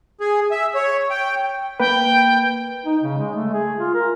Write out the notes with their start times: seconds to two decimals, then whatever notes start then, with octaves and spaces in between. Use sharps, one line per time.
0.20 G#4
0.51 E5
0.75 C#5
1.10 G5
1.80 A#3 B4 G5
2.86 D#4
3.03 C#3
3.18 G#3
3.35 A3
3.54 G#4
3.78 F4
3.94 A#4